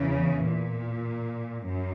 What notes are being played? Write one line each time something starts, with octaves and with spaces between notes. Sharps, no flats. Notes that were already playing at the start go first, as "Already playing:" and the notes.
Already playing: E2 C#3 E3
A#2
F#2